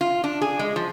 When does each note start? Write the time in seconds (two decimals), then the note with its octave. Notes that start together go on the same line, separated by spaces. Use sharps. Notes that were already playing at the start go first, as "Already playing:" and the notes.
0.01 F4
0.24 D4
0.42 G#4
0.59 G#3
0.76 F3